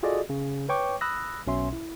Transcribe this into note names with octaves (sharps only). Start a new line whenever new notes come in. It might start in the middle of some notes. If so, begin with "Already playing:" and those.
F4 F#4 G#4 A4 D5 D#5
C#3
B4 C#5 G5 C#6 D6
B5 D#6 E6 F#6 A#6
B1 B2 C#4 E5 C6
E4